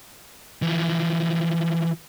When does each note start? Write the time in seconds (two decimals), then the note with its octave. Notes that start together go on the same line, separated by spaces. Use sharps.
0.62 E3 F3